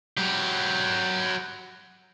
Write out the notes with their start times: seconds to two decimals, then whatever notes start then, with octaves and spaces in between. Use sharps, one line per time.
0.17 F#3 G4